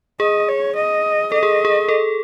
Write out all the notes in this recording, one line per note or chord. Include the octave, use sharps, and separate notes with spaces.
G#4 D#5
C#5
D#5
A4 D#5
G#4
G#4
A4